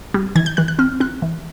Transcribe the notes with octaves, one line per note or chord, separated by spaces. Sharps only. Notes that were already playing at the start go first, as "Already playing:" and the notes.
G3
E3 G#6
G6
E3 F#6
F#6
C4 F6
C4 F#6
E3